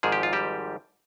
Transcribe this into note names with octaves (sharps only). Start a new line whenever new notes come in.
G#1 G#2 F3 G#4
G4
F4
G3 G4